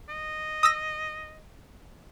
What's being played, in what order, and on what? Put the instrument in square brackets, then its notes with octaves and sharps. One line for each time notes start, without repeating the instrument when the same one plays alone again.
[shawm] D#5
[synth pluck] D#6 E6 A#6